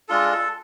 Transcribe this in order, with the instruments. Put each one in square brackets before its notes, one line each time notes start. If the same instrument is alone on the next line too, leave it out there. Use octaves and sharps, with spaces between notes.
[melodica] G#3 D4 F4 A4
A4